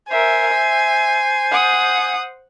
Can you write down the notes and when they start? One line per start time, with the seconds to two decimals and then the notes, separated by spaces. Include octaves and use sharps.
0.11 A#4 C5 E5 G#5
0.51 E5
1.51 F#5 D#6